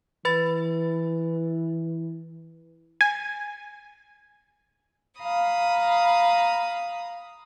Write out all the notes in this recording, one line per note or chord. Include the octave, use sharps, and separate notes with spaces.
E3 B4 B5 A6
G#5
F5 A#5 B5 D#6